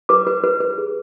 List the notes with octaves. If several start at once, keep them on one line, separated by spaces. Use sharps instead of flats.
B4 D6
B4
B4
B4
G#4